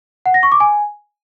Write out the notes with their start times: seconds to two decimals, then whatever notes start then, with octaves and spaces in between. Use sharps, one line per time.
0.26 F#5
0.34 A#6
0.43 C#6
0.52 D6
0.60 G#5